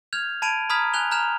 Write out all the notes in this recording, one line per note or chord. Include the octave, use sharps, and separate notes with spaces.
F6 G6 G#6 F7
A5 B5 G#6 D7 D#7 F7
A#5 B5 D#6 F6 G#6 B6
G#5 F#6 G6 F7 G7
A#5 F6 G6 E7 F7